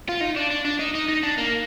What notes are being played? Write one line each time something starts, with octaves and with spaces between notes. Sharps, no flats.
F4
D#4
D4
D4
D4
D#4
D#4
D#4
D4
A#3